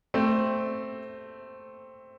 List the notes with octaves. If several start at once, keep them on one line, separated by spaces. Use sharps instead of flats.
A3 C4